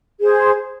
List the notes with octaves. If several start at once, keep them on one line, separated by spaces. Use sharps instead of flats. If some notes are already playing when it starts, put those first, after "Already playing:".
G#4 C5